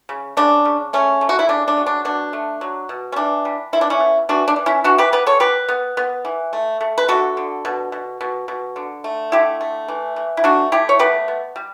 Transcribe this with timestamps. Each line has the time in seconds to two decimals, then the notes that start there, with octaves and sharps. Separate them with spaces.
0.09 C#3
0.37 C#3 D4
0.65 C#3
0.93 A3 C#4
1.21 A3
1.29 F#4
1.39 E4
1.49 C#3 D4
1.68 D4
1.77 F#3
1.86 D4
2.05 B2 D4
2.33 A3
2.61 F#3
2.89 B2
3.12 C#4
3.16 E3 D4
3.45 G3
3.73 E3 E4
3.81 D4
3.90 C#4 E4
4.00 B3
4.29 E3 D4 F#4
4.48 D4
4.56 E3
4.66 C#4 E4
4.84 E3 D4 F#4
4.98 G4 B4
5.12 B3 G4 B4
5.27 A4 C#5
5.40 B3 G4 B4
5.68 B3
5.97 B3
6.25 E3
6.53 A3
6.81 A3
6.98 B4
7.08 D3 F#4 A4
7.37 D3
7.65 B2
7.92 B2
8.21 B2
8.48 B2
8.76 D3
9.04 A3
9.32 D3 E4 G4
9.61 A3
9.88 E3
10.16 E3
10.37 E4
10.44 A3 D4 F#4
10.72 A3 E4 G4
10.89 C#5
10.99 B3 G4 B4
11.28 B3
11.56 G3